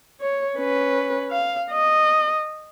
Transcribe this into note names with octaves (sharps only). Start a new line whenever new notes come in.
C#5
C#4 B4
F5
D#5